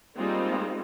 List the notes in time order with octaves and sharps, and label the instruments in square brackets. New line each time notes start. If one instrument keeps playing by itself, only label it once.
[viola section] G3 G#3 A#3 C4 D#4 F4